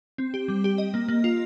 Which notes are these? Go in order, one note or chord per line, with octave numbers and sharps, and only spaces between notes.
C4
G4
G3
G4
D#5
A#3
A#3
F4